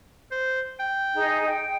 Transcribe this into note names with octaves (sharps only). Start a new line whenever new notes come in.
C5
G5
D#4 G#4
G5